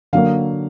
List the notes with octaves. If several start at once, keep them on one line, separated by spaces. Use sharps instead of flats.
D3 F#3 A#3 F5